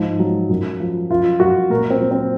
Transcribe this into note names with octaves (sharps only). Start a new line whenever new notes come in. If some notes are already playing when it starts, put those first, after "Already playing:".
Already playing: G#2 F3
F#3
F#2
F3
F#2 F4
F#2 F#4
A#2 A#4
C4
F#3
C4